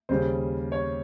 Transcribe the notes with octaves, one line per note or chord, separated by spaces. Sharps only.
D#2 C#3 G3 C5
C#5